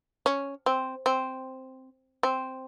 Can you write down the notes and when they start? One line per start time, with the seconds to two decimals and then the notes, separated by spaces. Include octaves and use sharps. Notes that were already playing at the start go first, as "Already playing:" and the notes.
0.26 C#4
0.66 C4
1.06 C4
2.23 C4